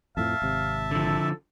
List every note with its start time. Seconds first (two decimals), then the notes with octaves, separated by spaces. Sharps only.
0.17 F2 A2 F3 E5 F5 A5
0.42 G#1 C3
0.91 D3 F3 A4